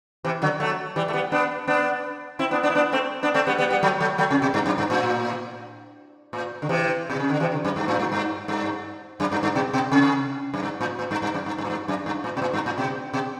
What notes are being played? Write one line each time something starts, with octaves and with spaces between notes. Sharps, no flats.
C3 E3
D3 F#3
F#3 A3
E3 G3
A3
G3 B3
B3 D4
B3 D4
C4 E4
B3 D4
B3 D4
E4
B3 D4
A3 C4
B3 D4
A3 C4
G3 B3
G3 B3
G3 B3
F#3 A3
F#3 A3
F#3 A3
C3
B2
G2
F#2
G2
A2
A2
D3
C3 E3
B2
C3
D3
C3 E3
D3
F#2
G2
A2
G2
G2
G2
F#2
G2
G2
B2
B2
C3
F#2
G2
A2
A2
G2
G2
F#2
G2
G2
A2
G2
F#2
G2
A2
B2
A2
G2
A2
B2
B2